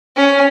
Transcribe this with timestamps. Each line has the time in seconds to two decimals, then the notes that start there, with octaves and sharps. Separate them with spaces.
0.16 C#4